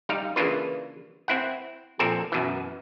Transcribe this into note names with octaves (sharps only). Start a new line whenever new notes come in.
G3 D#4 F5
C#3 E3 A#3 D4 F4 B4
C4 E4 F#5
F2 A#2 C4 A4 A#4 G#5
F#2 B2 E3